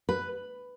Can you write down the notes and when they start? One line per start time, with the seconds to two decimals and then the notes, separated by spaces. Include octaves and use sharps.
0.09 B4